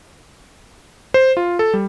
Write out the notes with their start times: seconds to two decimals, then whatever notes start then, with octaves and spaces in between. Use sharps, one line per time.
1.14 C5
1.37 F4
1.59 A4
1.74 G3